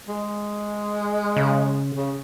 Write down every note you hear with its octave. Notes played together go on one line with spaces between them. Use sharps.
G#3
C#3
C#3